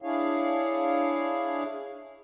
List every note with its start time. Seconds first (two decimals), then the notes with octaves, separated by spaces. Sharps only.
0.02 D4 E4 G#4 C#5 F5